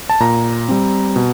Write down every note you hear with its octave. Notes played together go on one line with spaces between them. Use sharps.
A5
A#2 A#5
G3 C4
B2